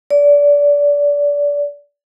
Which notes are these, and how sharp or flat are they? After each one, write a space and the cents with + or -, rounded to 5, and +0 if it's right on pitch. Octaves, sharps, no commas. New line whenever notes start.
D5 -25